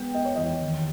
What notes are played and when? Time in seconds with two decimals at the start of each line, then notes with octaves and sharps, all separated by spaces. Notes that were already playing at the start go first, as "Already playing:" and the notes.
Already playing: G#3 B3 G5
0.14 B3 D#5
0.25 C#5
0.36 E2 D#5
0.62 D#2